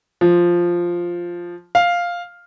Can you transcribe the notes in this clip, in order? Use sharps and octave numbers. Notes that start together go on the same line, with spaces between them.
F3
F5